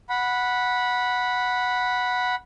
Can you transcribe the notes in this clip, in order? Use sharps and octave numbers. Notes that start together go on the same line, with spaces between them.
F#5 B5